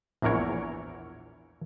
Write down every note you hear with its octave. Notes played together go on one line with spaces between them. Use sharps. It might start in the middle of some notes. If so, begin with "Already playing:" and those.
A#1 E2 E3 A#4 C#5